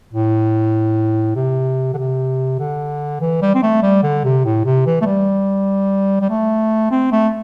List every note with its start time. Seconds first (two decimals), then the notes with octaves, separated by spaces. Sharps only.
0.13 A2
1.36 C3
1.94 D3
1.97 C3
2.59 D3
3.21 E3
3.42 G3
3.55 C4
3.63 A3
3.82 G3
4.03 D3
4.24 C3
4.45 A2
4.65 C3
4.86 E3
5.01 A3
5.06 G3
6.21 G3
6.30 A3
6.91 C4
7.12 A3